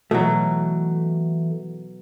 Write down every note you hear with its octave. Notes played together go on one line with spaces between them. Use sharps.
B2 E3 F#3 A3